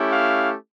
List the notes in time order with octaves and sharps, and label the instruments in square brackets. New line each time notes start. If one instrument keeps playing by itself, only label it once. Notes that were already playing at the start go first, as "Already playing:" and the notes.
Already playing: [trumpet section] A3 C#4 E4 G4
F5